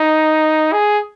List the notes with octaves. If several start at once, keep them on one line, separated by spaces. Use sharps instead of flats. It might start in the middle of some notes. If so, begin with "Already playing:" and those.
Already playing: D#4
G#4